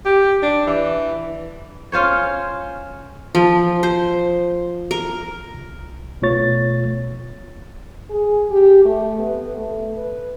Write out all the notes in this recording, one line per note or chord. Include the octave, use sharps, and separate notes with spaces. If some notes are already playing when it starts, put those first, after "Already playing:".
G4
D4
E3
C#4 F4 C5 C#5
F3
C5
A#4
C2
B2 A3 B3 F4 C#5 A6
G#4
G4
A3
B3
A3
B4